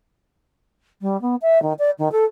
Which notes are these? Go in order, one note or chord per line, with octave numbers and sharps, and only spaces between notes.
G3
B3
E5
D#3
D5
D#3
A4